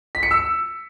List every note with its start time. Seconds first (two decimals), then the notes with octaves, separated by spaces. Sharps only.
0.15 B6
0.23 C#7
0.31 E6